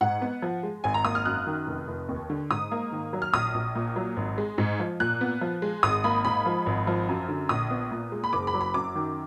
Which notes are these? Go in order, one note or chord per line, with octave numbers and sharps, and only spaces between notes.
G#2 F#5
B3
F3
G#3
G#1 G#5
A#5
A#3 D#6
F6
F#2 F#6
D#3
F1
F1
D#2
D3
G#2 D#6
A#3
D#3
F#3
F6
A#1 D#6
A#1
A#2
F#3
G#1
G#3
G#2
F3
A#2 F#6
B3
F3
G#3
G#1 D#6
A#3 B5
G#2 B5
F3
G#1
F3
F#2
D3
A#1 D#6
B3
A#2
G#3
B5
F#1 D6
B5
F#3
B5
F#2 D6
D#3